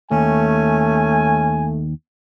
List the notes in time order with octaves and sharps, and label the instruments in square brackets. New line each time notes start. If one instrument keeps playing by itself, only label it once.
[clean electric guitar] D#2 [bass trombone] A3 [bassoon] C#4 [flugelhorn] G#5